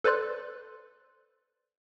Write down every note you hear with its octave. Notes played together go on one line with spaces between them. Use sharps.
A4 B4 C5 D5 C6 F#6